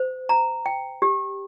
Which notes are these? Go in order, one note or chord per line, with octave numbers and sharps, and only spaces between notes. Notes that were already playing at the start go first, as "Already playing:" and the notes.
Already playing: C5
A#5
G5
G4